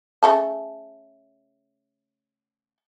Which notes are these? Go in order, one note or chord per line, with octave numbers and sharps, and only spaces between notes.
C#3 A3 A5